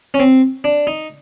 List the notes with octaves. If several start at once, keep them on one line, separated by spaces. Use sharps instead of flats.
C#4
C4
D4
D#4